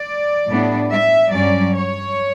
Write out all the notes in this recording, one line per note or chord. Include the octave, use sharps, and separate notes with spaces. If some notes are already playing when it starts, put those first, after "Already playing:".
Already playing: D5
A2 G3 B3 D4
E5
G2 F#3 C#4 D5
C#5